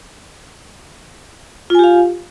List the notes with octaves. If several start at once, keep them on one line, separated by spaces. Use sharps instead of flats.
F4 G4 F5 G#5